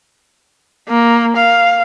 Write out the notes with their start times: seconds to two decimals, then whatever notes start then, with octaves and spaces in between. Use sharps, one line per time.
0.89 A#3
1.36 F5